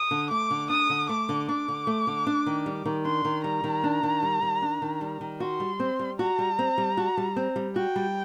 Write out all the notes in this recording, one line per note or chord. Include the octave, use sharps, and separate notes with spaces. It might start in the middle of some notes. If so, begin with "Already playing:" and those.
Already playing: D#6
D3
A3 D6
D3
D4 D#6
D3
A3 D6
D3
D4 D6
D3
A3
D3
D4
D#3
G3
D#3
D4 C6
D#3
G3 A#5
D#3
D4
D#3
G3
D#3
D4
D#3
G3
D#3
F#4 C6
G3
C4
G3
F#4 A#5
G3
C4
G3
F#4
G3
C4
G3
F#4 G5
G3